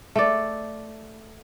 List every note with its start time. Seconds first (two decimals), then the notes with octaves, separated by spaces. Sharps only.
0.16 A3 D5